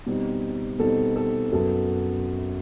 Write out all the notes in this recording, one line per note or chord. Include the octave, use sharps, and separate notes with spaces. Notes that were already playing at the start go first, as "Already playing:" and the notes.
B2 G3 C4 D#4
B2 G3 C4 D#4 A4
A4
F#2 F#3 B3 A4